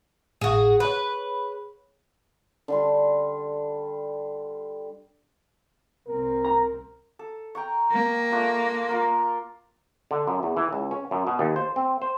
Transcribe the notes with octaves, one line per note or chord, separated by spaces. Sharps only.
G#1 A2 F#4 G#4
G#4 B4 C#5
D3 G3 C6
C2 C4 A#4
A#5
A4
G5 A#5 C#6
A#3
A3 D4 F4
F4 A#4
D3
F#2
E2
E3
C#2
C#4
F#2
B2
D#2
C5
C4
C5